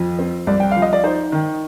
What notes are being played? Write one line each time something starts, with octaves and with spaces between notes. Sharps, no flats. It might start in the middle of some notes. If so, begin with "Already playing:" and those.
Already playing: F2 F3
C4
C2 D5
G5
F3 F5
D#5
D5
D#4 C5
D#3